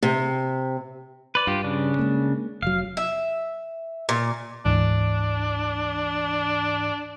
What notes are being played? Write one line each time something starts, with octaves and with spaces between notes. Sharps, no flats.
C3
B4 D5
G2 F4 G4
C#3 D4
G#3 A#3
F1 F#3 F5
E5
A#2
D2 G#2 E3 D4